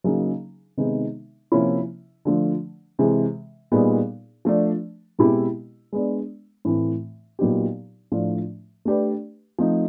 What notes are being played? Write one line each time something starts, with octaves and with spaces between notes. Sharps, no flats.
C#3 F#3 A#3 D#4 G#4
C3 D#3 G#3 B3 D#4
C3 F3 A#3 C#4 E4
D3 F3 A3
C3 E3 G#3
A#2 G3 B3 D#4 G#4
F3 A3 D4
B2 G#3 C4 E4 G4
G#3 B3 D4
A2 E3 A3 C4
A#2 F#3 B3 D#4 G4
A2 F3 A3 D4 F4
A3 D4 G4 B4
F3 A3 C4 D#4